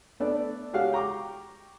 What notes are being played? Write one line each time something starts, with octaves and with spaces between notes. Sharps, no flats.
A3 B3 D4 A4 B4 D5
G#3 F#4 G4 C#5 F5 F#5
G5 A#5 C#6 D6